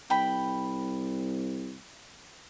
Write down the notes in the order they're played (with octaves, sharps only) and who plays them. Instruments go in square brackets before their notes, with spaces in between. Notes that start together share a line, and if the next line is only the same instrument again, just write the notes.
[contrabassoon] C2 [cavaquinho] G5 B5